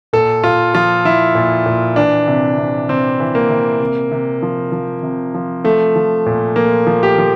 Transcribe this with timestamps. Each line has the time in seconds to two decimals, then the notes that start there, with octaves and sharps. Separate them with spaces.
0.13 A#2 A4
0.44 A#2 F4
0.75 F3 F4
1.05 F3 E4
1.35 A#2
1.66 A#2
1.96 E3 D4
2.28 C3
2.58 C3
2.89 C3 C4
3.20 E3
3.35 A#3
3.50 C3
3.81 C3
4.12 C3
4.42 F3
4.72 F3
5.03 C3
5.34 F3
5.64 F3 A3
5.96 F3
6.26 A#2
6.56 F3 A#3
6.87 F3
7.03 G4
7.18 F3